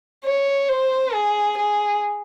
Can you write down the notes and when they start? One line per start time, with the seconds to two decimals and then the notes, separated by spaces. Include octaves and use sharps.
0.25 C#5
0.69 C5
1.13 G#4
1.58 G#4